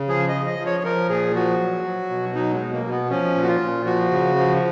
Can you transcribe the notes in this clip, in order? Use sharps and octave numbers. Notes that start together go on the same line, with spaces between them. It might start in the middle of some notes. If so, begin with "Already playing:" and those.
Already playing: C#3
F3 G#4
D#5
F3
D#5
F3
C#5
F3 A#4
A#2 G#4
F3 F#4
F#3
F#3
B2
F#3 D#4
G#3
B2
A#3
B2
B3
F3 C#4
A#2
F#4
F4
A#2
F3 F#4
C#3
F3